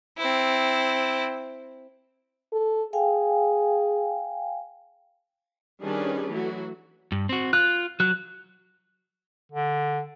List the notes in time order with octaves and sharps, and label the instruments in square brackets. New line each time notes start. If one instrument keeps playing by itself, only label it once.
[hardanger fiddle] C4 E4
[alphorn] A4
[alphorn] G#4 [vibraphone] F5 G5 G#5
[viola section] D#3 G3 C#4 D4 G#4 B4
E3 F#3 A3 F#4
[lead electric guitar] G2
C4 F#4
[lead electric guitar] F4 [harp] F#6
[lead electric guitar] F#3 [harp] F#6
[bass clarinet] D3